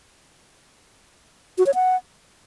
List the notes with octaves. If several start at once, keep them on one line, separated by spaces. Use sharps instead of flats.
F#4
C#5
F#5